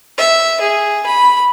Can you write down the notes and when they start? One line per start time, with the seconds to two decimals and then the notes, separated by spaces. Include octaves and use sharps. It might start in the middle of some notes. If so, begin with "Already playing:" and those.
0.18 E5
0.61 G#4
1.06 B5